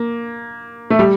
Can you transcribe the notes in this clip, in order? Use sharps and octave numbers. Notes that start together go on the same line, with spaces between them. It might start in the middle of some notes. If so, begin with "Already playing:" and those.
Already playing: A#3
A3
G3